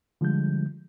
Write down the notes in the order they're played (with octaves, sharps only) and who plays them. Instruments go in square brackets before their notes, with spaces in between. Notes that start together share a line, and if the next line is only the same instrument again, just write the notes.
[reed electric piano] D3 F3 G3 G#3 G6